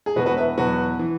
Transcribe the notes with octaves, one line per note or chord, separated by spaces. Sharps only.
G#4
E1 E2 B2 F#4 B4
F#4 B4
B4 E5
E2 B2 F#3 F#4 B4
E3